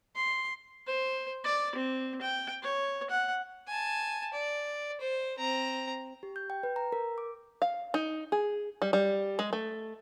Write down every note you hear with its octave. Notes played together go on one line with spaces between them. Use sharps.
C6
C5
D5
C4
G5
C#5
F#5
G#5 A5
D5
C5
C4 A#5
G4
G6
G5
B4
A#5
A#4
D6
F5
D#4
G#4
G3
G3
G#3
A3